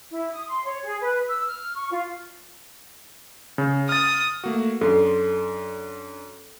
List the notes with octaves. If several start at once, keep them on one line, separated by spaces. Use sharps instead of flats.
E4
D#6
C6
C#5
G#4
B4
E6
F6
C#6
F4
C#3
D#6 F6 A6
A3 A#3 F#4
F#2 D4 A4 C6